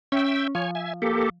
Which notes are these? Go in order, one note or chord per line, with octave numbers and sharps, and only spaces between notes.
C#4 E5 G5
F3 C#5 G#5
E5 G#5
A#3 G4 A4